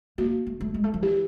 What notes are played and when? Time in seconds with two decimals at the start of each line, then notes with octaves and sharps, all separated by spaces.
0.18 A#3 F#4
0.47 A3
0.61 A3
0.74 G#3
0.84 A3
0.94 F3
1.02 E3 G4